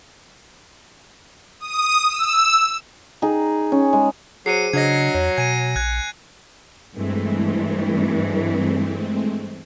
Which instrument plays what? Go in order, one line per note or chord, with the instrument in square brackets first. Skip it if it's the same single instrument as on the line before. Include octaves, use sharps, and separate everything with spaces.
[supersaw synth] D#6
E6
[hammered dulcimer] D#4 G#4
C#4
G#3
[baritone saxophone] F#3 [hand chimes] G#4 C5 [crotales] C7 C#7 D#7
[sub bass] C#3 [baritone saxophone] F#3 [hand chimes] D4 D#5 [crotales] G#6 A#6
[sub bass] E2 [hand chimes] C#5
[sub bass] B2 [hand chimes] G#5 [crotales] G#6 D#7
[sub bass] A#1 [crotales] F#6 G#6
[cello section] G2 E3 [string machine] G#3 A3 C4